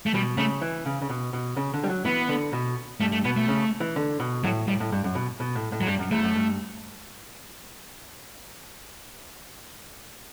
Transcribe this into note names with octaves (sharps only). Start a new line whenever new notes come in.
A3
B2 G3
C#3 A3
E3
C#3
C#3
B2
B2
C#3
D3
G3
F#3
E3 B3
D3
B2
G2 A3
A3
B2 B3
A3
C#3
E3
D3
B2
A2 F#3
A2 G3
A2
G2
F#2
B2
B2
A2
A2
F#3
G2 G3
F#2
E2 A3
F#2
G2